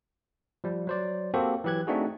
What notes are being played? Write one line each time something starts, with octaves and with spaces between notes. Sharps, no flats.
F3 G3
F#3 C5 D5
A#3 C4 F#4 G4 A4 C5
E3 F#3 G4 F#6 G#6
A3 C4 D4 D#4 F#4 G#4